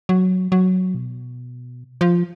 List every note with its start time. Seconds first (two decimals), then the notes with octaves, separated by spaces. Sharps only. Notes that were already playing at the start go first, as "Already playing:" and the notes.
0.09 F#3
0.52 F#3
0.94 B2
2.01 F3